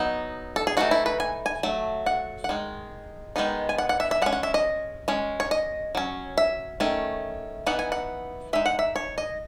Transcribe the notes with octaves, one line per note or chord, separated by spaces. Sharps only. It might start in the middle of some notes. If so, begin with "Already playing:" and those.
Already playing: F#3 B3 D#4
A4
G#4
E3 A3 D#4 F#4
E4
B4
G#5
G#5
F#3 A3
F#5
F#5
D#3 G#3
D#3 G#3 B3 D#4
G#5
F#5
F#5
E5
E5
G#3 C#4 F#5
F#5
E5
D#5
G#3 C#4
C#5
D#5
F#3 C#4
E5
D#3 A3 C#4
E3 B3 D#4 F#5
G#5
F#5
G#3 D#4 E5
F#5
E5
C#5
D#5